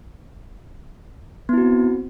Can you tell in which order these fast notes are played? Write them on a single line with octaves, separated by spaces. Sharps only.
B3 E4 F#4 C4